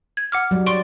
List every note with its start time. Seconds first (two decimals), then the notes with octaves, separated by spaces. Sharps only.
0.17 G#6
0.32 F#5 D6 F6
0.51 F#3 G3
0.66 D5 C6 C#6 D7